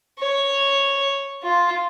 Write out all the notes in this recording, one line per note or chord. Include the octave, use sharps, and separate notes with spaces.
C#5
F4